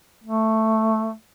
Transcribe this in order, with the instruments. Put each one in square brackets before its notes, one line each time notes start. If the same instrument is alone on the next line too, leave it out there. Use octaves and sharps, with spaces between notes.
[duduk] A3